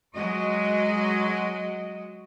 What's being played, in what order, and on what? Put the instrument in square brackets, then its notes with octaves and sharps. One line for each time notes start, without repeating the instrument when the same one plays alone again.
[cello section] F#3 G#3 F#4 D#5